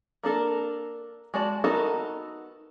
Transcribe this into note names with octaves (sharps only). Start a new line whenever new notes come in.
A#3 D4 A4 A#4
G#3 F#4 D5 A5
B3 D#4 F#4 A4 A#4